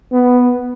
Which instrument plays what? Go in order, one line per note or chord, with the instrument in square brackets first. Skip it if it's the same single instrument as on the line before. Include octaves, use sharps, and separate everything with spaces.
[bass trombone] B3